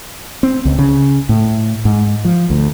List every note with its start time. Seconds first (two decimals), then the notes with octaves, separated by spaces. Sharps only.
0.43 C4
0.65 C#2
0.79 C#3
1.29 A2
1.85 G#2
2.25 F3
2.50 D2